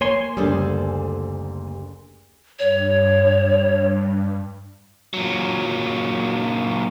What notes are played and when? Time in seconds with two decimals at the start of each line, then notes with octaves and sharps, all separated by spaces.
0.01 A#3 C#5 G#5 C6
0.37 F#1 D2 D3 G3 G#4 A4 C5
2.59 G2 C#5
5.14 A#2 F#3